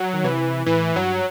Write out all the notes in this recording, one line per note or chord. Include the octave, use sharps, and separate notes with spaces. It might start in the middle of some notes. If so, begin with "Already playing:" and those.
Already playing: F#3
D#3
C3 E3
A2 E3
G2 F#3